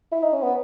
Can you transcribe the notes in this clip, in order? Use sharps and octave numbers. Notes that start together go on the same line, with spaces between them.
E4
D#4
C#4
B3